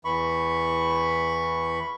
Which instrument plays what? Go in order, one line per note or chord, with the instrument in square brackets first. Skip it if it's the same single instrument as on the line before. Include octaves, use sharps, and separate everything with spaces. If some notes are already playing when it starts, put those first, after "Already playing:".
[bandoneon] E2 E3 B5 C#6